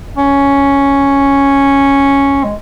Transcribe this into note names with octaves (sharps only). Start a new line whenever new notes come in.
C#4
G#3